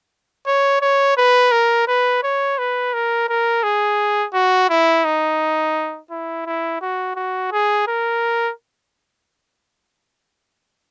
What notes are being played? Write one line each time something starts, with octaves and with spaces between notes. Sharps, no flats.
C#5
C#5
B4
A#4
B4
C#5
B4
A#4
A#4
G#4
F#4
E4
D#4
E4
E4
F#4
F#4
G#4
A#4